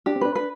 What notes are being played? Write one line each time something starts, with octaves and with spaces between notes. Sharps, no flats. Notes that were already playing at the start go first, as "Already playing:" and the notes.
D4 G4
C4
D4 B4
B4